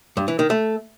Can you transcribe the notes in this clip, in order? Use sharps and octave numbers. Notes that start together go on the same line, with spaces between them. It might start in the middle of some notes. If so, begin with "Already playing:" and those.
G2
E3
D#3
A3